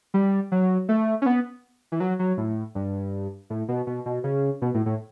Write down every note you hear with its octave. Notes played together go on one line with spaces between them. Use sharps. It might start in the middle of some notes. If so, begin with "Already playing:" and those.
G3
F#3
A3
C#4
B3
E3
F#3
F#3
A2
G2
A2
B2
B2
B2
C#3
B2
A2
A2